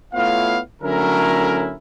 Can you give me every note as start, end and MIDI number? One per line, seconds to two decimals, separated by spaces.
0.14 0.59 57
0.14 0.59 59
0.14 0.59 64
0.14 0.59 65
0.14 0.59 73
0.14 0.59 77
0.82 1.74 50
0.82 1.74 54
0.82 1.74 57
0.82 1.74 61
0.82 1.74 64
0.82 1.74 70